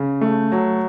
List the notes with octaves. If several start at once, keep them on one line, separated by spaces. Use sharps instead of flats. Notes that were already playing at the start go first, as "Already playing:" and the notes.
Already playing: C#3
A3
F#3